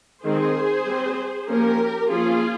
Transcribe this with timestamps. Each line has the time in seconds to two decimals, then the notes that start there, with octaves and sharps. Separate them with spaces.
0.23 D#3 G#3 C4 G#4 C5
0.85 G3 C4
1.47 F3 A#3 C#4 G4 A#4
2.09 F3 A#3 C#4 F4 G#4